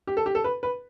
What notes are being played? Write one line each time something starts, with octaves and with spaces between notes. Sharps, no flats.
G4
A4
G4
A4
B4
B4